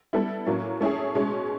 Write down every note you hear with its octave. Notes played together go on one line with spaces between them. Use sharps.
G3 B3 E4 A4
A2 F#3 A#3 C#4
A3 C#4 E4 G#4
B2 G#3 C#4